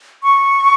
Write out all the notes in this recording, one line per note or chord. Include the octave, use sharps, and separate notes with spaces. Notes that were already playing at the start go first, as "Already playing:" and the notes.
C#6